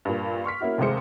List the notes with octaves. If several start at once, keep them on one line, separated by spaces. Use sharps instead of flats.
G2 A#2
C6 C#6 F6 B6
A#3 C#4 E4 F#4
F1 D#2 C3 G#3 C5 C#7